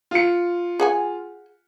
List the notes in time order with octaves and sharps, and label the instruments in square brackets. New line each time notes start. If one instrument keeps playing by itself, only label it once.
[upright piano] F4 C#7
[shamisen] G#4 F#5 G#5